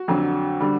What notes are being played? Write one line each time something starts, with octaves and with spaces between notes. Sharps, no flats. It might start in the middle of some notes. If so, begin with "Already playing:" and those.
Already playing: F#4
F2 D3 F#3
D3 G3